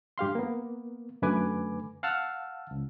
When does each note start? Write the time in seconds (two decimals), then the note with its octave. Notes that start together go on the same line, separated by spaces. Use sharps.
0.18 G2 G4 F5 C6
0.35 A#3 B3
1.22 F#2 D3 A3 B4 G#5 D6
2.03 F5 F#5 A5 E6 F6
2.71 C#2